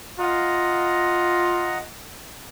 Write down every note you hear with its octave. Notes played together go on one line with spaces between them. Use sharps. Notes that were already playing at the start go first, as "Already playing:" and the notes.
F4 D#5 F#5 A#5